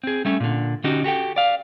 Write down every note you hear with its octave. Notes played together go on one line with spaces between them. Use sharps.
C4 G#4
G3 A3 C#4
A#2 D3
D3 C#4 D#4 F#4 G4
F#4 G4 A4 G5
D5 F5